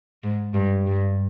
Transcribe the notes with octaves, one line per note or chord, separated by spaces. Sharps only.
G#2
G2
G2